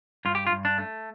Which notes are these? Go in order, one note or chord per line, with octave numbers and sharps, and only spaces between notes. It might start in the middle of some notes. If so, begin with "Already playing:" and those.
G2 F4
G4
F4
G2
D4
A3